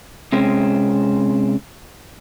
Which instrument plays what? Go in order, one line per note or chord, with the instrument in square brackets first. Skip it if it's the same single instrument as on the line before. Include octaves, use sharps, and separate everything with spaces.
[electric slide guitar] C3 G#3 C4 C#4